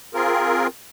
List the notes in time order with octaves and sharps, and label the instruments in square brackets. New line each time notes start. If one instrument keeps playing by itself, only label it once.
[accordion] C4 F4 G#4 A#4